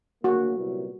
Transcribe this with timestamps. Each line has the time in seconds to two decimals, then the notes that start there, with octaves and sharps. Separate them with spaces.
0.24 D2 C#3 F#3 A#3 F#4
0.56 C2 A#2 F#3 B3 E4